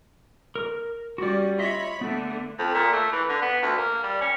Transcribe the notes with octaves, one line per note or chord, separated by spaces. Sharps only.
A#4
G3 C#4 F#4 D5
F4 C#5 D#5 E5 B5
D3 A3 B3
F2
A#2
A3
E3
D3
B3
D2
A#3
G3
C#4